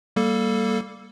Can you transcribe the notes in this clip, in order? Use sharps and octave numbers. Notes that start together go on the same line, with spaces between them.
G3 A#3 A4